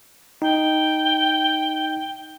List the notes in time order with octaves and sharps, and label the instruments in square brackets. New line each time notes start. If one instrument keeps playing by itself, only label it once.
[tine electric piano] D#4 [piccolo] G5